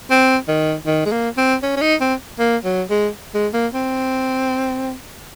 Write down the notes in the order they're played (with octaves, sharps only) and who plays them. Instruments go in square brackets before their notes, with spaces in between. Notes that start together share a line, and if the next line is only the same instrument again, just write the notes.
[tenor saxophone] C4
D#3
D#3
G#3
A#3
C4
C#4
C#4
D#4
C4
A#3
F#3
G#3
G#3
A#3
C4